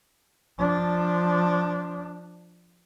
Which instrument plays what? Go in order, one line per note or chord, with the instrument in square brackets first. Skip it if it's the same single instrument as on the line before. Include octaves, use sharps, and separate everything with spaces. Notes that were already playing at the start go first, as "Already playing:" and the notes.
[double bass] F3 D4